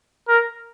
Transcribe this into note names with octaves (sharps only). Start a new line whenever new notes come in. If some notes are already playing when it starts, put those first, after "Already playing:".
A#4